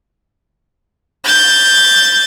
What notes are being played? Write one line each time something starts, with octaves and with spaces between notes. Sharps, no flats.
G6 A6